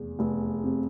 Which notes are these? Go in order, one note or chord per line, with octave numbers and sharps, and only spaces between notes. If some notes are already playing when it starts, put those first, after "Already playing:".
Already playing: F1 E2
F1
C3